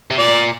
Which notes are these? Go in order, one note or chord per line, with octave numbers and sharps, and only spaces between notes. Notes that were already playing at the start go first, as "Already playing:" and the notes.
C3
A#2 D5